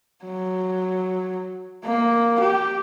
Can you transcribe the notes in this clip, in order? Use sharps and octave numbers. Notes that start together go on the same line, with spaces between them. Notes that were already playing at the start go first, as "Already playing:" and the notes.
F#3
A#3
G4